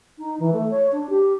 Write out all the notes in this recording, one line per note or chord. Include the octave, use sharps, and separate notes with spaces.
D#4
E3
A3
C#5
D4
G4